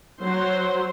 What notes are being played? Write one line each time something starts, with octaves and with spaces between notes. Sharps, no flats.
F#3 C5 C6